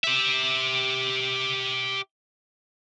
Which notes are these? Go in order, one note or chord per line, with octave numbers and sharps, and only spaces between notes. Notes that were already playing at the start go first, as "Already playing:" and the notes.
G4 E5